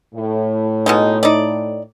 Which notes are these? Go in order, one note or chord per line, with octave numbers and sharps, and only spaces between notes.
A2
B2 G#3 D#4
D#4 D5